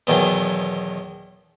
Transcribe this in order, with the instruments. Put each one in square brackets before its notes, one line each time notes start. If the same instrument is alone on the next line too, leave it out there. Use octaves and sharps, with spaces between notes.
[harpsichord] E2 B2 D#3 E3 F#3